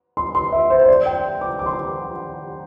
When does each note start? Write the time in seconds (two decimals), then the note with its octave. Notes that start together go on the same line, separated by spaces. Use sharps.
0.17 C6
0.35 C6
0.52 E5
0.70 C5
0.84 C5
0.88 D5
1.06 G5
1.41 D6
1.59 D6
1.66 C6
1.73 D6